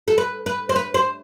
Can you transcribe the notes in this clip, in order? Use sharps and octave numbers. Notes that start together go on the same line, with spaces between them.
A4
B4
B4
C5
B4
C5